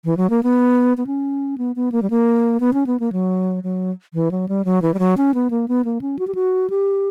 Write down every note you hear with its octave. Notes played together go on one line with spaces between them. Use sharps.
E3
F#3
A#3
B3
B3
C#4
B3
B3
A#3
G3
A#3
B3
C#4
B3
A#3
F#3
F#3
E3
F#3
G3
F#3
E3
G3
F#3
C#4
B3
A#3
B3
A#3
C#4
F#4
G4
F#4
G4